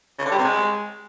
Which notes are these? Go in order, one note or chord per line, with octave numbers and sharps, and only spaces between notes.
C#3
D3
G3
C3
G#3